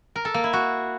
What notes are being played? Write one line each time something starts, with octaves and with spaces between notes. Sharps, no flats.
A#4
A4
A#3
E4
F#4